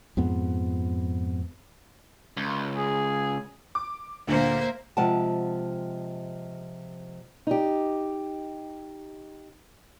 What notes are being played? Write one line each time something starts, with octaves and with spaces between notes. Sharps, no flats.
F2 G#2 B3
C#2
G#4
D6
D2 A#2 D3 A#3 C5 E5
C3 F3 G#3 F#5 G5 A5
D#4 G4